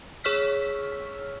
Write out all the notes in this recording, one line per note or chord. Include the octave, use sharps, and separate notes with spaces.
G#4 C#5 C#6 E6 F6 B6